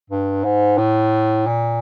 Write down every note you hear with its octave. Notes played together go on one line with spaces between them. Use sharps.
G2
G#2
A2
A#2